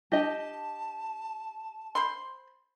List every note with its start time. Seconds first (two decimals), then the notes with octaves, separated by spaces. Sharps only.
0.12 D4 G4 D#5 G5 A5
1.95 C5 B5 C6